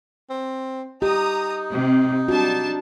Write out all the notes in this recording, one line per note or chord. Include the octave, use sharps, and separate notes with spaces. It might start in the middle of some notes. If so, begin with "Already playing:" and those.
C4
D#4 G4 A#5 D#6
C3
G3 D4 F#4 A5